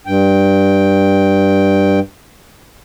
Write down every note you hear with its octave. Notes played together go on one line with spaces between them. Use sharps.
G2 G5